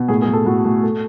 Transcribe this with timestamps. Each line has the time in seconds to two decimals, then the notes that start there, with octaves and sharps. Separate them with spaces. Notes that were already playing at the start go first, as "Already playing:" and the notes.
Already playing: B2
0.08 A2 G#4
0.22 G#4
0.27 A2
0.33 A4
0.46 A2 F#4
0.64 A2
0.83 A3